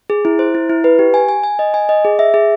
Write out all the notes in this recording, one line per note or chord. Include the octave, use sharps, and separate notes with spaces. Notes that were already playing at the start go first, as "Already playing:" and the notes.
G#4
E4
C5
E4
E4
B4
G4
G#5
G#5
G#5
D#5
G#5
D#5
G#4
E5
G#4